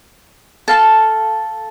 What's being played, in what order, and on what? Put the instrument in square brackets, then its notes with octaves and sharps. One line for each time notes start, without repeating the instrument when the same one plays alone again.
[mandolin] A4 F5 A5